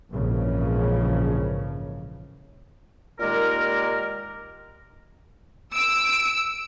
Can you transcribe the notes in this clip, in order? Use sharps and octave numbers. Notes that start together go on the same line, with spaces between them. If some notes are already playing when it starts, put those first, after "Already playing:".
A#1 F2 G#2 C#3 E3 F3
A#2 D#3 G#3 G4 A#4
E6 D7